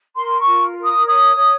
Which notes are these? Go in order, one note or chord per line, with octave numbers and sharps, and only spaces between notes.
A#4 C6
C#6
F4
A#4
D#6
C#5 D#6
C#5